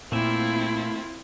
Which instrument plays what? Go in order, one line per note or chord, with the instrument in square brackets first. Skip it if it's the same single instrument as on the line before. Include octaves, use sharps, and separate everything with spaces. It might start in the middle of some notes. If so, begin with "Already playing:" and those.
[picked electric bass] A#2 [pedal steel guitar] A3 A#3 E5 [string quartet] C4 E4 F4